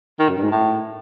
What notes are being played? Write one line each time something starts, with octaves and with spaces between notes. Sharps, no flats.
D#3
F#2
G2
G#2
A2